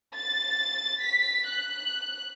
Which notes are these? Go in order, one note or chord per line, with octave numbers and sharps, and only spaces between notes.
A6
B6
F#6